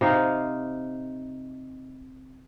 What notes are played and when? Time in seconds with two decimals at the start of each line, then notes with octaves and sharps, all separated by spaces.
0.01 C3 D#4 F5